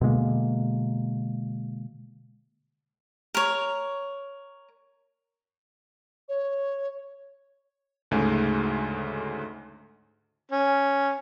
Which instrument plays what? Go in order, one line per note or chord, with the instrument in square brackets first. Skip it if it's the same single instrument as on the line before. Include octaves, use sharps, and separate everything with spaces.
[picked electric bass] B2 D3 G#3 A#3
[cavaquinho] A#4 C#5
[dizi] C#5
[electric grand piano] D2 G#2 C#3 G#3 A3
[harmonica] C#4